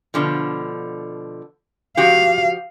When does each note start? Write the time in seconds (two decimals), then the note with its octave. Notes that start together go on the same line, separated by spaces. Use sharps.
0.14 B2 D3 F3
1.97 F3 F#4 G4 F5